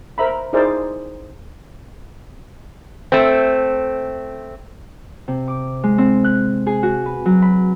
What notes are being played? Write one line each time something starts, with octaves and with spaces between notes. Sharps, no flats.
A#4 C5 E5 A#5 B5
D#4 E4 G#4 A#4 C5 D5
A3 C4
C3
D6
G#3
C4
F#6
G#4
F#4
B4
F#3
B5